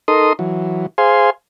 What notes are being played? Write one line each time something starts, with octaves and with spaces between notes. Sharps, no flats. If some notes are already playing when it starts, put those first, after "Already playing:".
D#4 A4 A#4 C6 D#6
E3 F#3
G#4 C5 F5 G#5 C6